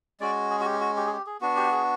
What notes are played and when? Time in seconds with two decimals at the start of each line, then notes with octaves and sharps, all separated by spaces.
0.20 G#3 C#4 F#4 D5
0.50 G#4
0.60 F#4
0.65 G4
0.80 F#4
0.96 G4
1.07 G#4
1.12 G4
1.27 G#4
1.41 B3 D4 F#4
1.56 G4
1.72 G#4